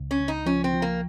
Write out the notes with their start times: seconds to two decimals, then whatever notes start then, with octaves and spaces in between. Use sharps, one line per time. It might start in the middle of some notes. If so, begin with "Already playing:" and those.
Already playing: C#2
0.11 C#4
0.19 C#2
0.28 D#4
0.46 F3 C#4
0.64 C4
0.73 F3
0.82 A#3